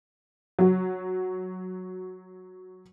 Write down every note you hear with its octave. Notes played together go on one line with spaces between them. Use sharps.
F#3 F#4